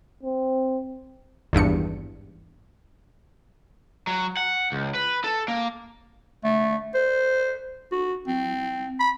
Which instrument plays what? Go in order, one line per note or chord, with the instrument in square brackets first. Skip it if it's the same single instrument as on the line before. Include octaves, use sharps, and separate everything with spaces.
[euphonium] C4
[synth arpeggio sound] G#1 E2 G2 C#7
[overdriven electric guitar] F#3
F#5
C#2
B4
A4
A#3
[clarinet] A3
C5
F#4
C4
B5